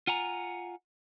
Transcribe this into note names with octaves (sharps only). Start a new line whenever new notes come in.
F4 F#5 G#5 A#5